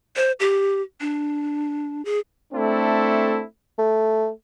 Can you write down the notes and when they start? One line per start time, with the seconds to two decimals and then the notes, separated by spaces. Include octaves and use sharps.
0.16 C5
0.40 G4
1.01 D4
2.05 G#4
2.54 A3 C4 D4 E4 A4
3.78 A3